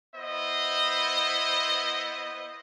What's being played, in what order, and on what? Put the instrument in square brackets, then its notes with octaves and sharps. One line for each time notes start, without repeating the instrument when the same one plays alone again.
[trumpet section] B3 E4 C5 D#5